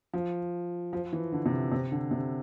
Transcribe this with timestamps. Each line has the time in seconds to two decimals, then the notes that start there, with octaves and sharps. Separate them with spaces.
0.13 F3
0.93 F3
1.13 E3
1.32 D3
1.46 C3
1.72 C3
1.92 D3
2.11 C3